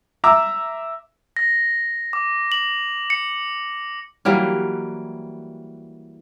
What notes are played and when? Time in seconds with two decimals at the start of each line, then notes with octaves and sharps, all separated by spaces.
0.24 E5 A#5 D6 E6
1.37 A#6
2.13 D6
2.52 F#7
3.10 C#7
4.25 E3 F#3 G3 A#3